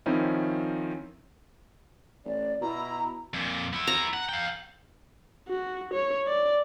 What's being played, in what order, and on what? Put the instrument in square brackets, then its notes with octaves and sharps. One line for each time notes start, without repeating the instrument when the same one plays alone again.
[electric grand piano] D#3 F3 C4 C#4 D#4 E4
[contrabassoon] A1 [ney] D5
[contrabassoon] B2 [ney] E4 [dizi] A#5
[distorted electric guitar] F2 A#2
B3 E4
[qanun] A#5
[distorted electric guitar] F#5
F5 G5
[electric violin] F#4
C#5
D5